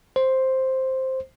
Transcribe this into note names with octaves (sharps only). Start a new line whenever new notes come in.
C5